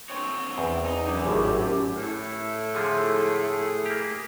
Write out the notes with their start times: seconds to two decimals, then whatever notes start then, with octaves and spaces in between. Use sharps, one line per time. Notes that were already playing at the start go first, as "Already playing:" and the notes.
0.10 C4 C#5
0.58 E2
0.86 D#4
1.07 F#2 D6
1.25 G#1 A2 G4
1.96 A2 A3
2.74 D3 F3 G#3 G#4
3.86 A#3 G4